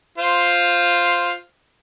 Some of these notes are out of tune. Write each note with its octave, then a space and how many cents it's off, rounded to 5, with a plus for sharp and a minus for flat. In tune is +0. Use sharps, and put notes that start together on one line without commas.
F4 +0 C5 +0